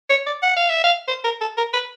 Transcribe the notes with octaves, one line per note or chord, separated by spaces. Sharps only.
C#5
D5
F#5
F5
E5
F5
C5
A#4
A4
A#4
B4